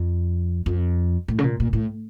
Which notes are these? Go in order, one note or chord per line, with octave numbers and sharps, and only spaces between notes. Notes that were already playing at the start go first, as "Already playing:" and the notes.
Already playing: F2
F2
A2
C#3
A#2
A#2
A2